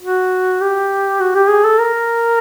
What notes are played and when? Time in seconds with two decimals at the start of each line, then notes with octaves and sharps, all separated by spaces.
0.02 F#4
0.61 G4
1.20 F#4
1.35 G4
1.49 G#4
1.64 A4
1.79 A#4